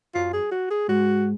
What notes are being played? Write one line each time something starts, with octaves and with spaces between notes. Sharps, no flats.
F#2 F#3 F4
G#4
F#4
G#4
G#2 G#3 F#4